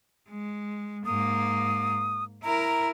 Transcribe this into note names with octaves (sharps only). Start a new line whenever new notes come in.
G#3
G#2 A#3 D#6
E4 A#4 A#5